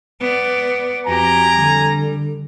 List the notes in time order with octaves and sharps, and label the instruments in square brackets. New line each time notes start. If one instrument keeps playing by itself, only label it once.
[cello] B3 D5
[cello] F2 G4 [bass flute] F#4 [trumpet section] G#5 A#5
[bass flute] D3 [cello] G3